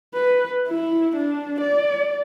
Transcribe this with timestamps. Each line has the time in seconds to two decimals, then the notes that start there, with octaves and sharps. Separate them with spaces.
0.14 B4
0.68 E4
1.16 D4
1.61 D5